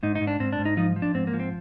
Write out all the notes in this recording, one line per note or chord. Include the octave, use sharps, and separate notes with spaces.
G#2 D#4
D#4
G#2
D4
G#2 C4
D4
G#2
D#4
F3 D#4
F3
D4
G#2 C4
A#3
F3
C4